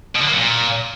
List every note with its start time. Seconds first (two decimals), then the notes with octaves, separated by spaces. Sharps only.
0.15 B2
0.21 D3
0.26 A#3
0.32 F#3
0.38 A#2